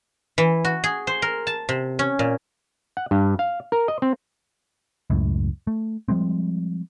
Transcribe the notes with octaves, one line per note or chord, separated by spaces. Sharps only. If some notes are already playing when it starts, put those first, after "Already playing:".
E3
F#4
G#4
C5
A#4
A5
C3
C#4
A#2
F#5
G2
F5
A#4
D#5
C4
C#2 F#2 A2
A3
F3 G3 G#3 C4